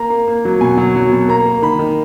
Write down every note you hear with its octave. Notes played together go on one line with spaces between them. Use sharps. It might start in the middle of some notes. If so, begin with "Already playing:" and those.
Already playing: A#3 A#5
A#3
A#3
F#3
B2 G#5
F#3
F#3
B2
A#3 A#5
A#3
D#3 B5
D#3